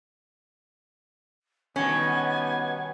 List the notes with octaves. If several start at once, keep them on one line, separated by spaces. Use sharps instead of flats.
B2 D#3 G3 B3 C#4 G#5